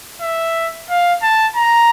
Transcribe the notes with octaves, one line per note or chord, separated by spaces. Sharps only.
E5
F5
A5
A#5